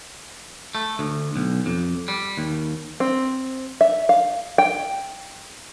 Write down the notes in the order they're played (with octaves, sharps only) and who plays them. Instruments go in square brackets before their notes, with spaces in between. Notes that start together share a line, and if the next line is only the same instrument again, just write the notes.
[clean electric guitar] A3
D2
B1
F2
G3
D#2
[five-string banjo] C4
E5
F5
G5